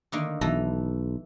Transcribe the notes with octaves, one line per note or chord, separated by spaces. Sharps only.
D3 D#3 A#3
B1 E3 A4 A#5